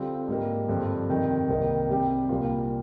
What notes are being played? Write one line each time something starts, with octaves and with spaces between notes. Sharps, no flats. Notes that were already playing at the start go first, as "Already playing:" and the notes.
Already playing: D3 G3 C4 F4
G#2 G3 A#3
G2 D3 F3 C4
F2 C3 D#3
C2 C3 D#3 A#3
C3 G3 C4 G4
C2 A#2 G3 A#3 F4